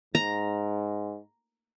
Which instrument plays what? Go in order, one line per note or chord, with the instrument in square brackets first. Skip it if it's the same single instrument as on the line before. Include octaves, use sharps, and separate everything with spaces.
[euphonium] G#2 [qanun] A#5